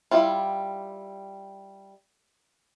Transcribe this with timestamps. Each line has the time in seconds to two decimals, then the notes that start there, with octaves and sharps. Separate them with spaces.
0.11 G3 E4 F4